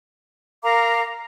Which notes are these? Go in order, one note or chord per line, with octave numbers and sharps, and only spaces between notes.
A#4 F5 A#5 D6